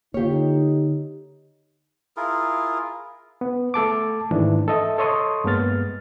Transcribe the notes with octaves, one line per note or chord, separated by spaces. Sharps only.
D3 A#3 D#4 F4 G4 C#5
E4 F4 G#4 A#4
B3
A3 A4 A5 D6
G#2 D#3 E3 A3 D4
A4 D#5 E5
A4 C#5 D#5 C6 C#6 D#6
G2 G#3 A#3 B3 F6 A6